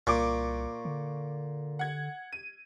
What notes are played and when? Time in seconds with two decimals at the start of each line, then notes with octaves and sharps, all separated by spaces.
0.07 C2 A#2 C#6 D6
0.85 D3
1.79 F#5 G#6
2.33 D#7